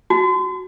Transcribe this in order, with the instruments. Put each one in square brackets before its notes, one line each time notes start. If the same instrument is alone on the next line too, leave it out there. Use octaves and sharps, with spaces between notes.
[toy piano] F#4